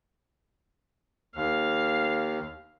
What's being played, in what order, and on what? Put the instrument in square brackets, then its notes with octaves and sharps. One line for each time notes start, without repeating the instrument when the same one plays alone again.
[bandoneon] D#2 [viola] F5